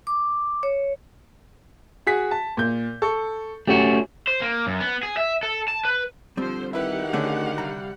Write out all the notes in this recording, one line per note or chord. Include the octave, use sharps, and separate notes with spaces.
D6
C#5
F#4 G#4 B6
A5
A#2 G6
A4 C#6
A3 C#4 F#4 G4
C5
A#3
F#2
B3
G#4
E5
A4
A5
B4
D3 F3 G3 C4 C5
D#3 E4 G4 B4 F#5
D3 A3 C#4 G#4
C2 G3 A#5